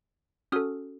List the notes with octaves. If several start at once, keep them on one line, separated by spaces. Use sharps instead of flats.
C#4 F#4 A4 D#6 F6